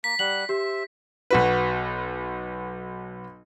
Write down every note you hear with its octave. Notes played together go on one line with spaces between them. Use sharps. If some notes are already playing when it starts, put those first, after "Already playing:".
A#3 A#5 B6
G3 F#5 F#7
G4 C5 E5
B1 F#4 B4